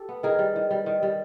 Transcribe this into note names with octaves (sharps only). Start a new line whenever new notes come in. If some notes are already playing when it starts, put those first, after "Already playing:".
Already playing: G4 A4
B3
D#3 G#4 A#4
G3
D#3
G3
D#3
G3